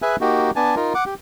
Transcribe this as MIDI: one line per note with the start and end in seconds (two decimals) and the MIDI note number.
0.02 0.16 68
0.02 0.16 71
0.02 0.16 76
0.02 0.16 80
0.02 0.16 90
0.21 0.51 58
0.21 0.51 63
0.21 0.51 66
0.21 0.51 67
0.56 0.75 59
0.56 0.75 62
0.56 0.75 80
0.56 0.75 81
0.76 0.93 63
0.76 0.93 65
0.76 0.93 70
0.95 1.04 78
0.95 1.04 86
1.06 1.14 67